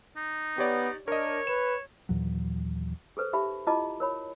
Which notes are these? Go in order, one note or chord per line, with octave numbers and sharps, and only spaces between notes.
D#4
B3 G4 C#5 D5
D4 A#4 C#5 D#5
B4 E7
D#2 A#2 E3 F#3
G#4 A4 B4 C5
D#4 G4 E5 B5
E4 F4 D#5 A5 A#5 D6
A#4 C#5 B5